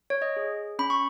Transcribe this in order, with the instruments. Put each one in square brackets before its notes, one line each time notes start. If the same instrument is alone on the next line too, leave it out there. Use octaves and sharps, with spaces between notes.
[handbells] C#5
D#5
G#4
C#4 B5
C#6